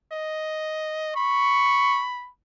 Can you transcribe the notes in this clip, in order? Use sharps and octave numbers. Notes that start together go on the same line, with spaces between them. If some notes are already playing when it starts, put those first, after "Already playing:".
D#5
B5 C#6